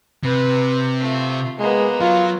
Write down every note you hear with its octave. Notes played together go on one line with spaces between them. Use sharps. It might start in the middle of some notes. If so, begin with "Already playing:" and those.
C3 B4
A3 F4
G#3 A#3 B3
F#3 F4